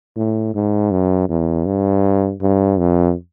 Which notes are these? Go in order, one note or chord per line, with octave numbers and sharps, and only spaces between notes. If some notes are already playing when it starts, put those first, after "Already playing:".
A2
G#2
F#2
E2
G2
G2
F2